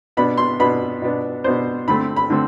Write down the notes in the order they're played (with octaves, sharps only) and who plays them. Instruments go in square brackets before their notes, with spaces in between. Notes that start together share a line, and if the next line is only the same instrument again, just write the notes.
[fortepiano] B2 B3 D4 B5
C6
B2 B3 D4 B5
B2 B3 D4
B2 B3 D4 C5
D3 A3 C4 B5
B5
D3 A3 C4